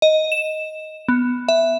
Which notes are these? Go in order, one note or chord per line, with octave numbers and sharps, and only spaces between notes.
D#5
E7
B3
E5